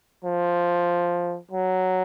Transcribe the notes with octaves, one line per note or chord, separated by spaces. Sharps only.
F3
F#3